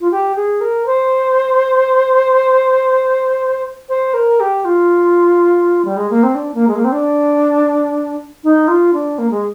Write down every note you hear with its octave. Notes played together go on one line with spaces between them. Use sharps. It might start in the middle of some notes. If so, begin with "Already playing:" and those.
F4
G4
G#4
A#4
C5
C5
A#4
G4
F4
G3
G#3
A#3
C4
D4
A#3
G#3
A#3
C4
D4
D#4
F4
D4
A#3
G#3